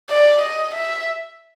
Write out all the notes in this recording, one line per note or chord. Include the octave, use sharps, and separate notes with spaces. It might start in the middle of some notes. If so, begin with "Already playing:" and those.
D5
D#5
E5